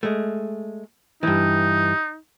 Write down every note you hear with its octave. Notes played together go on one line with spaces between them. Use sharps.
G#3 A3
G2 E3 D#4